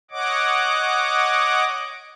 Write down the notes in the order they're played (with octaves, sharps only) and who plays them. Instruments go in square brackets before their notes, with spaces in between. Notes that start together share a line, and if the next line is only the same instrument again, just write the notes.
[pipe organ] C#5 D#5 F#5 D6